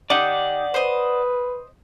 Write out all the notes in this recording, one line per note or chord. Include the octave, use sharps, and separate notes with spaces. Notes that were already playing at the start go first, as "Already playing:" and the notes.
D#4 G4 D5 F#5
B4 C5 D#5